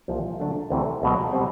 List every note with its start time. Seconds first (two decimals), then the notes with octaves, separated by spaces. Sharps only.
0.08 C2 A#2 F3 A#3 D#4
0.40 D3 F#3 A3 D4
0.70 D2 C3 E3 A3 C4
1.02 C#2 B2 F#3
1.33 B2 G3 C4